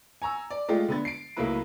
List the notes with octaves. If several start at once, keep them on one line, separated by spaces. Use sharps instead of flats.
G#5 A#5 C#6 E6
D5
G#3 A3 F4 G4
D3 B3 A6
C7 D7
C#2 F#3 A3 A#3 E4 B4